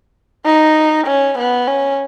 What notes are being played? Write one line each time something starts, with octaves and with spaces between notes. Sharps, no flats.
D#4
C#4
B3
C#4